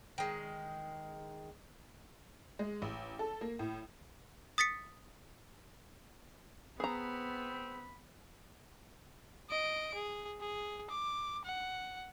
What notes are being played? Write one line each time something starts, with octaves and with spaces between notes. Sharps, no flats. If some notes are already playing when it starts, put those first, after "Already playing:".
D#3 G#3
G#3
A1
A4
A#3
A2
D#6 A6 B6 C#7
B3 C4 G#4 A#5 B5
D#5 D7
G#4
G#4
D6
F#5